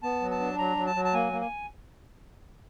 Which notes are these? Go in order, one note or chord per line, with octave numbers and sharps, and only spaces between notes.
B3 A5
F#3
A5
D4
F#3 A#5
F#3
A5
F#3
A5
A#3 G#5
A#3
G#5